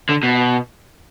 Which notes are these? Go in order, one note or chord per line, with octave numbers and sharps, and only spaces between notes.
D3
B2